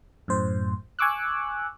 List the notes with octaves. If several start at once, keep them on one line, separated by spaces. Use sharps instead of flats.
F#2 A2 C5
G#5 C#6 D6 E6 F#6